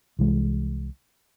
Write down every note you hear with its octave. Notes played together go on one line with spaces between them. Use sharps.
C2 E3 G#3